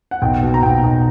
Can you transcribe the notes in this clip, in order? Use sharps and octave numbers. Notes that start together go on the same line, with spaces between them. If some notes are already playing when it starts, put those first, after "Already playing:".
F#5
B1 G5
B2
A#5
B1 G5
B1